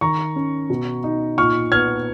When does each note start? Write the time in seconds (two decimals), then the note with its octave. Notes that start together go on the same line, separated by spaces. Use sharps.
0.01 D#3 A#5 C#6
0.36 C#4
0.70 B2
1.04 D#4
1.38 A#2 C#6 F6
1.72 B3 F6 G#6